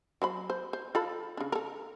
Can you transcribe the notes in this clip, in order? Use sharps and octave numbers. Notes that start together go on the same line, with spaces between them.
F#3 C5 B5
C5
C5
F4 A4 B5
C#3 D4
A4 A#4